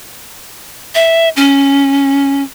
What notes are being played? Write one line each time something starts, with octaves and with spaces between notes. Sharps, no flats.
E5
C#4